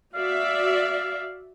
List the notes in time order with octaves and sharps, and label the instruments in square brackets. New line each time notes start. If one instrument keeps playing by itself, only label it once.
[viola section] F#4 D5 E5 [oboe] F5